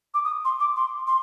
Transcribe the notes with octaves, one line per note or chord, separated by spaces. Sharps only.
D6
D#6
C6
D6
C6
C6